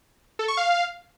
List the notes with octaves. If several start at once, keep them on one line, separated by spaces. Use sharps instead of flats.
A4
C#6
F5